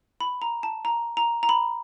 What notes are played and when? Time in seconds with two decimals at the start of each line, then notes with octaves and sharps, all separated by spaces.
0.20 B5
0.42 A#5
0.63 A5
0.85 A#5
1.17 A#5
1.43 A#5
1.49 B5